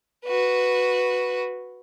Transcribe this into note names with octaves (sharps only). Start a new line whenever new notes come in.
F#4 B4